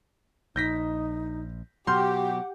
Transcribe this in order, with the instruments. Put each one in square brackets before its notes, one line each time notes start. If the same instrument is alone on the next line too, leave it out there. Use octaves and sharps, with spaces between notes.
[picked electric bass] A#1 [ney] D#4 [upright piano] G6 A#6 B6
[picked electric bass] B2 F#3 [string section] G4 [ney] F#5 [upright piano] C6 F6 G6